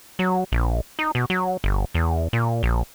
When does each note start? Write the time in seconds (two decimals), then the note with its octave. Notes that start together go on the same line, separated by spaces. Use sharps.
0.19 F#3
0.52 A#1
0.99 D#4
1.15 B2
1.30 F#3
1.64 G1
1.95 E2
2.33 A#2
2.63 A#1